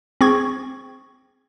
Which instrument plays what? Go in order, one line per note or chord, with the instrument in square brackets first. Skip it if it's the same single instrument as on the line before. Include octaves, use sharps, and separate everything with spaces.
[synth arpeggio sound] C4 G#4 C#6 G#6